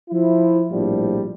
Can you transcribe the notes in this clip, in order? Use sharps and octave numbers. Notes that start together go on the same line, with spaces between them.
F3 E4
A#1 A2 F3 G3